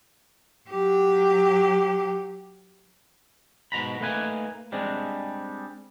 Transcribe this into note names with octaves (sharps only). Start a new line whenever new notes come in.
F#3 G4
G#2 B2 A#5 B5
A3 A#3 D#4 B4 G#5
G3 G#3 C4 D4 G#4